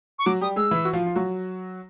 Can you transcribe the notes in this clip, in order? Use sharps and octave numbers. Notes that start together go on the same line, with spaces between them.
C#6
F#3 F#4 D6
G3 G4 D#6
G#3 G#4 E6
E3 E4
F#4
F3 F4
F4
F#3 F#4